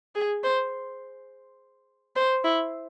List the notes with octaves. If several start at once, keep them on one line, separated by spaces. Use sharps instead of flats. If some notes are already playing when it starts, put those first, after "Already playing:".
G#4
C5
C5
E4